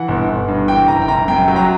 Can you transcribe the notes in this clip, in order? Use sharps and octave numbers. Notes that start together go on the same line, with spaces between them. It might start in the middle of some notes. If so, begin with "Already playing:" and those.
Already playing: E3 F#5
G1
G1
G2
E3 G5
F#1 A#5
G5
F#1 A#5
F#2 G5
F#3 G5
A#5